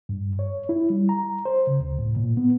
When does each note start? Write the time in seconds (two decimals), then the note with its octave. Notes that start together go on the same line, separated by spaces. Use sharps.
0.09 G2
0.39 C#5
0.69 E4
0.90 G3
1.09 A#5
1.45 C5
1.67 C#3
1.80 D2
1.99 A2
2.16 A#2
2.37 B3